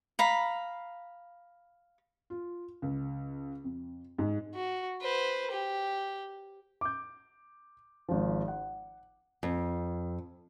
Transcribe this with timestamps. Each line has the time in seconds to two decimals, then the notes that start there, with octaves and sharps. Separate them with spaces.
0.19 F5 A#5 B5
2.30 F4
2.82 C#2
3.64 F2
4.19 G#2
4.55 F#4
5.02 B4 C5
5.51 G4
6.81 D6 G6
8.09 G#1 F3
8.48 F#5
9.43 F2